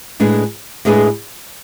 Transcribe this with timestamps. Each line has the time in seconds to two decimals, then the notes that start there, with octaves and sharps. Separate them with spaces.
0.20 A2 G#3 D4 G#4 B4
0.85 A2 G#3 D4 G#4 B4